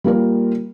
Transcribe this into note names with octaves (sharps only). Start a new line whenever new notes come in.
G3 A#3 F4 A#4